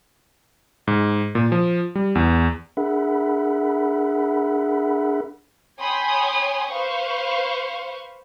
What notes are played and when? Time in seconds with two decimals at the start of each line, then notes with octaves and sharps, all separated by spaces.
0.87 G#2
1.35 A#2
1.52 F3
1.95 G3
2.15 E2
2.77 D4 G#4 A#4 E5 F#5 B5
5.80 C#5 G5 G#5 B5 C6 D#6
6.69 B4 C5 F5 C#6